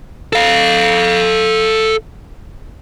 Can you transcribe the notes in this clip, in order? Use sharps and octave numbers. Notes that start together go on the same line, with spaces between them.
A4 F5